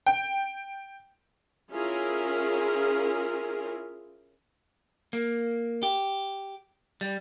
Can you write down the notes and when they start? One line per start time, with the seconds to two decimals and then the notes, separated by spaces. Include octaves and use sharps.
0.07 G5
1.71 C#4 E4 F4 G#4 A#4
5.13 A#3
5.83 G4
7.01 G3